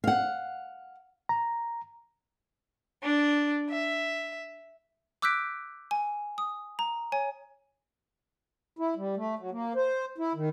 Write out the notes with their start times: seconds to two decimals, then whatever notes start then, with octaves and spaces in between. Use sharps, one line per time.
0.04 F5 F#5
1.29 A#5
3.03 D4
3.69 E5
5.22 D6 E6 F#6 G6 B6 D7
5.91 G#5
6.38 D#6
6.79 A#5
7.12 C#5 G#5
8.79 E4
8.96 G3
9.17 A3
9.39 F#3
9.51 A#3
9.76 C5
10.18 E4
10.35 D#3